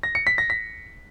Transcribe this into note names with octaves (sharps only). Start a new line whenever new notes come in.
A#6
C#7
B6
A#6
B6